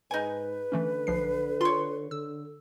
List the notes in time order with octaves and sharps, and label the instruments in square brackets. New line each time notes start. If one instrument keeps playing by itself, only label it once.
[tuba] G#2 [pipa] D#4 G#5 [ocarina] B4
[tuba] D3 [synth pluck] E3 A3 C#4
[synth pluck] B1 F3 C7
[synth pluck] F4 [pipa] C#5 C6
[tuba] D3 [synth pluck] E6